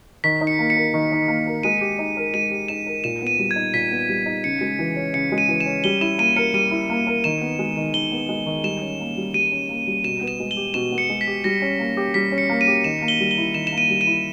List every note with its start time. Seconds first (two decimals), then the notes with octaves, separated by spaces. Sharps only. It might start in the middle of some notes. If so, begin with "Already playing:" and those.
0.24 D#3 B6
0.41 D#4
0.47 C#7
0.59 A#3
0.70 C#7
0.76 A#4
0.94 D#3
1.12 D#4
1.28 A#3
1.46 A#4
1.63 G#3 D#7
1.81 G4
1.99 D#4
2.17 A#4
2.34 G#3 D#7
2.51 G4
2.68 D#4 E7
2.86 A#4
3.04 A#2 E7
3.22 B3 D#7
3.39 G3
3.51 G#6
3.56 D#4
3.74 A#2 B6
3.91 B3
4.09 G3
4.26 D#4
4.44 C#3 C#7
4.61 G#3
4.79 E3
4.96 C#4
5.14 C#3 C#7
5.32 G#3
5.38 D#7
5.48 E3
5.61 E7
5.66 C#4
5.84 G3 G7
6.01 E4 E7
6.18 A#3 D#7
6.36 A#4 C#7
6.54 G3 D#7
6.71 E4
6.90 A#3
7.07 A#4
7.24 D#3 E7
7.41 B3
7.59 G#3
7.77 D#3
7.94 D#3 G7
8.12 B3
8.29 G#3
8.46 D#3
8.64 G3 E7
8.82 C#4
9.00 A#3
9.17 G3
9.34 G3 D#7
9.52 C#4
9.69 A#3
9.87 G3
10.04 B2 E7
10.21 B3
10.28 E7
10.40 G#3
10.51 G7
10.57 G4
10.74 B2 E7
10.92 B3
10.98 C#7
11.10 G#3
11.21 B6
11.27 G4
11.44 G3 A#6
11.62 C#4
11.79 A#3
11.97 G4
12.14 G3 B6
12.32 C#4
12.38 C#7
12.49 A#3
12.61 D#7
12.68 G4
12.84 D#3 E7
13.02 A#3
13.08 G7
13.20 G3
13.31 G7
13.38 E4
13.54 D#3 E7
13.67 E7
13.72 A#3
13.78 D#7
13.90 G3
14.01 D#7
14.07 E4